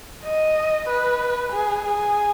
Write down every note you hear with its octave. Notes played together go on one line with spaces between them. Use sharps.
D#5
B4
G#4
G#4